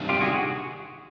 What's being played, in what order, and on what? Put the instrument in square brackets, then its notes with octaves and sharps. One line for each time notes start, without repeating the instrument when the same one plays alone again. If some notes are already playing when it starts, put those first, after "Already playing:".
Already playing: [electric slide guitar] C3 D#3 G3 A#3 D4
[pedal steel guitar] F4 G4
F#4 G#4
F#4 G#4